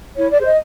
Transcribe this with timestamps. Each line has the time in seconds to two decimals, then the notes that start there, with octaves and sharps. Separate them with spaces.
0.17 E4 C#5
0.30 D5
0.38 G#4 C5
0.45 D#5